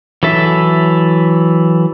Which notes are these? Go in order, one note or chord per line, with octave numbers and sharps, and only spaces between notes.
E3 F#3 A4 E5